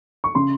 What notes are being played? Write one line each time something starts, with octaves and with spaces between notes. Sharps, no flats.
C#6
C#3 C6